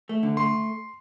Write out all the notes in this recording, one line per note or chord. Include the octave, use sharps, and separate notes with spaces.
A3
D3
A3 C6